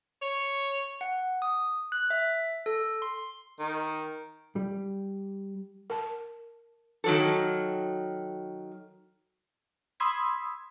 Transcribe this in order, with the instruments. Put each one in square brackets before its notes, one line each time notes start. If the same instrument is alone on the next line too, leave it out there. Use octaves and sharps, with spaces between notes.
[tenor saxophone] C#5
[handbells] F#5
D#6
F#6
E5
A4
C6
[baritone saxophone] D#3
[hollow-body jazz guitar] G3
[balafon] A#4 A5
[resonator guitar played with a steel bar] D#3 F#3 A4
[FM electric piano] B5 C6 D#6 E6 G#6 B6